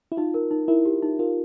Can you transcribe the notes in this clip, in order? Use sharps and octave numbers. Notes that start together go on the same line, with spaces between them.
E4
D#4 F4
A#4
D#4
E4 A#4
G4
D#4
F4 A#4